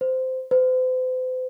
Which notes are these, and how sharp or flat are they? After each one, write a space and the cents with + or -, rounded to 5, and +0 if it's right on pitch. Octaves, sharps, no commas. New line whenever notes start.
C5 -15
C5 -40